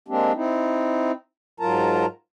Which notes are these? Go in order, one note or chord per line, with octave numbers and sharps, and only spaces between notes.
G#3 A#3 C4 D4 G4
C4 D#4 E4
G#2 F#3 F4 A#4 A5 A#5